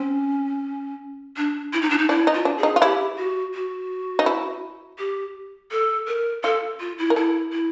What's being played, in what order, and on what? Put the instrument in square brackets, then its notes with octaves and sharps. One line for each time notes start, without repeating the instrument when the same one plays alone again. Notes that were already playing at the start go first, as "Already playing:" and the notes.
Already playing: [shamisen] C4 [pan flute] C#4
[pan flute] D4
E4
D#4
D4
D#4
[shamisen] D4 [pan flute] E4
[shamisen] D#4
[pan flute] F4
[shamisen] D4
[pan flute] G#4
[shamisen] D#4
F4
[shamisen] E4 [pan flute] G4
[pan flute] F#4
F#4
[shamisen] D#4
E4
[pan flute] G4
A4
A#4
[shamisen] F4 [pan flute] A4
[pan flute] F4
E4
[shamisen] A#4
[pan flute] E4 [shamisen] A4
[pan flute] E4